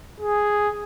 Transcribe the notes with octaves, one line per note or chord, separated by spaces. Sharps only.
G#4